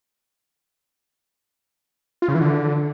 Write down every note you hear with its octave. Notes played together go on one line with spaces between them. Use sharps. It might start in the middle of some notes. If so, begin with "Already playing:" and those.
F4
C#3
E3
D3